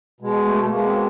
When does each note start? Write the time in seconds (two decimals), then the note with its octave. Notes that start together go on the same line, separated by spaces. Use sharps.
0.20 B2 G#3
0.45 A3
0.61 A3
0.69 B2 G#3 A#3
0.86 A#3 C4